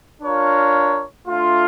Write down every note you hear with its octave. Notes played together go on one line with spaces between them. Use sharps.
D4 F4 A#4 C#5
A3 D4 F4